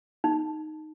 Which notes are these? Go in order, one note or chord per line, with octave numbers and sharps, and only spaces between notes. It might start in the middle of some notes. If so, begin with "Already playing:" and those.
D#4